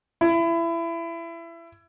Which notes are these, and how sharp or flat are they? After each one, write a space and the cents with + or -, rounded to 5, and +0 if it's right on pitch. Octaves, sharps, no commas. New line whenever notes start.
E4 +25